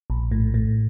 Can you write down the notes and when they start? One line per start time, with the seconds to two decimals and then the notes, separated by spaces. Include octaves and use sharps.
0.10 A#1
0.31 A2
0.54 A2